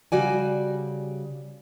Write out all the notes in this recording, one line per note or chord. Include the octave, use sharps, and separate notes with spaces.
C#3 G3 F#4 D5 G#5